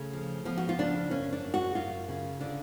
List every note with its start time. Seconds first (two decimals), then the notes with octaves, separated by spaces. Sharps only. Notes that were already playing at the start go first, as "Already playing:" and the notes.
Already playing: C#3 A3
0.13 F3
0.45 F3 B3
0.58 F#4
0.69 F4
0.79 C#3 D4
1.11 F#2 C#4
1.33 D4
1.43 F#2
1.54 F#4
1.75 F#2 F4
2.08 C#3
2.40 D3 D4